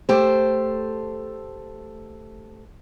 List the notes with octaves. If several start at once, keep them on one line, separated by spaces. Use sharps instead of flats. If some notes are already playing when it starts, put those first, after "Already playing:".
A3 G4 A4 C5